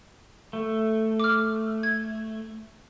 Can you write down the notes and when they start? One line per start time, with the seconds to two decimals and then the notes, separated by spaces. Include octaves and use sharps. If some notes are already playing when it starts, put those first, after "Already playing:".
0.53 A3
1.20 D6 F6
1.83 G#6